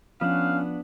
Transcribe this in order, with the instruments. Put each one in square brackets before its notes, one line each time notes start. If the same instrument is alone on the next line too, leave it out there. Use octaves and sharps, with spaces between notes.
[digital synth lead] F3 [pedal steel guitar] B3 D4 F#5 [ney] C#4 [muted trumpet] F5